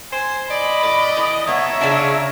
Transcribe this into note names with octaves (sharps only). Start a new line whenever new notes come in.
C5 G#5
D5 D#5 B5
A2 D5
E3
A3 B3 C#5 E5 A#5
C#3 D4 D#4 F4